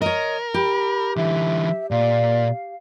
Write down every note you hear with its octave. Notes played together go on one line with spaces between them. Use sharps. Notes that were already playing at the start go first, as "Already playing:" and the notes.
A#4 C#5 D#5
G4 B5
D3 E3 E5
A#2 D5 F5